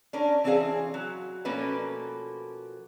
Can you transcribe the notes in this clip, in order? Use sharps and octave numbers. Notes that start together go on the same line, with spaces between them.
C#4 D4 A#4
E3 C4 C#4 E4 G#4 F5
F#3
B2 F3 A3 A#3 C#4 B4